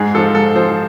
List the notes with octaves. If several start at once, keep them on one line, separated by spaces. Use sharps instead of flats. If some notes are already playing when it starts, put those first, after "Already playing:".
Already playing: G#2 G#4
F3 A4
G#2 A4
F3 C5